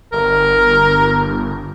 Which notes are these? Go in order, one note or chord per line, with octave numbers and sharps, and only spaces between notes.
G1 A#4